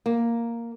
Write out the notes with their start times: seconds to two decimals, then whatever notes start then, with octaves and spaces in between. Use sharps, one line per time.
0.06 A#3